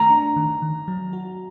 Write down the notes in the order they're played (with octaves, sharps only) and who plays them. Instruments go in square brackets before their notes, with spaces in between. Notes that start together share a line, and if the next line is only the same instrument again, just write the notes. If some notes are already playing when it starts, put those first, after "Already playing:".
Already playing: [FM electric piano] D#3 A3 [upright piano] A#5
[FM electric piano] D4
D#3
D#3
F#3
F#4